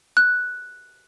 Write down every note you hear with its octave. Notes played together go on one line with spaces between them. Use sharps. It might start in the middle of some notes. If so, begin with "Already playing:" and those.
F#6